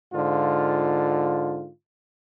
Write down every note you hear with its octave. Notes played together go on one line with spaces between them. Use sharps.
G#2 D3 F4